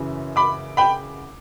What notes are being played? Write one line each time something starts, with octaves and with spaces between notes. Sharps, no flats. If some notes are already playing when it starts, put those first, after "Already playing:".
Already playing: F#2 C#3 E3
B5 D6
G5 B5